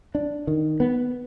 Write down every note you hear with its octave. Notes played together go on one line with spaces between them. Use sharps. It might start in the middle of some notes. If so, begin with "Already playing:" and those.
D4
D#3
B3